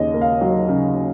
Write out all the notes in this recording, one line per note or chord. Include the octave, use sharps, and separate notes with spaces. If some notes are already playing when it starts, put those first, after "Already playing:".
Already playing: D#2 C#3 G#4 D#5
A#3
F5
F#3
C#3